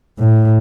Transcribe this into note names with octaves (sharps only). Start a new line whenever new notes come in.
A2